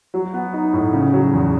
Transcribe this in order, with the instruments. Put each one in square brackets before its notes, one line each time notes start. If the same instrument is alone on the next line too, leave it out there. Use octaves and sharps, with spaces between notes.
[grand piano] F#3
B3
D#4
A2
C#3
F#3
E2